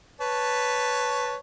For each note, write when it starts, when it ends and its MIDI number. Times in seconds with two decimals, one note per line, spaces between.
0.21 1.36 71
0.21 1.36 73
0.21 1.36 81